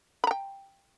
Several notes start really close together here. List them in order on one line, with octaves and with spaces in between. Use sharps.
B5 A#5 G5